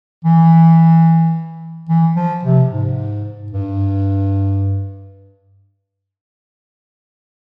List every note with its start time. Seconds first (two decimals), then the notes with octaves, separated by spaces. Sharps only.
0.25 E3
1.89 E3
2.15 F3
2.43 C3
2.70 G#2
3.52 G2